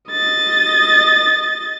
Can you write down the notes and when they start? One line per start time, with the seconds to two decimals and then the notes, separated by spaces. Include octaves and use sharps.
0.11 D#5 A6